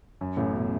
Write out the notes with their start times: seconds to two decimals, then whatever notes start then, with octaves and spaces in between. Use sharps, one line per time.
0.21 F#2
0.37 A1 A2
0.54 B2